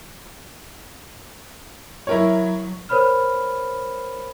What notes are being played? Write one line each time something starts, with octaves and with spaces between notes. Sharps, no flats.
F#3 E4 A#4 C#5
A#4 C5 C#5 B5 F6